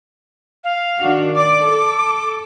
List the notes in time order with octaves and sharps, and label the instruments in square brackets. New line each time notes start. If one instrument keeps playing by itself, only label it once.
[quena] F5
[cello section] D#3 D4 F#4
[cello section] D5 [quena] D6
[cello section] A4